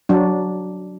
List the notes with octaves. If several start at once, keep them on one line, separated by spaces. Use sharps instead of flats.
F#3 D4